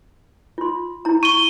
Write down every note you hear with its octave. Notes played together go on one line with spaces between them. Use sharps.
F4 C6
E4 A#5
C#6 D#7 G7